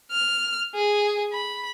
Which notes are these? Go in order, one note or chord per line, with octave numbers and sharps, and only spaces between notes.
F6
G#4
B5